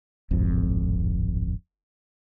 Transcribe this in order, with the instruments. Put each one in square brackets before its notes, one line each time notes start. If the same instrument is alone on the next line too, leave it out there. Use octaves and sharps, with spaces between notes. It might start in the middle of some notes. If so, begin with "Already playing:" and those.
[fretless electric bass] D1 G#1 F2